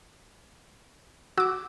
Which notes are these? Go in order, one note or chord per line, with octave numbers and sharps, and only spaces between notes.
F#4 D6 E6